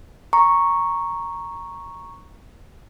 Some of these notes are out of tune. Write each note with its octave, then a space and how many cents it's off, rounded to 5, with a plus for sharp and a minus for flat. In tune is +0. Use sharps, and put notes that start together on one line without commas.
A#5 +0 C#6 +0